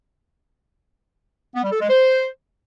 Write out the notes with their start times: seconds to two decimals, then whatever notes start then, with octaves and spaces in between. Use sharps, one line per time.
1.55 B3
1.63 G3
1.72 A4
1.81 G#3
1.89 C5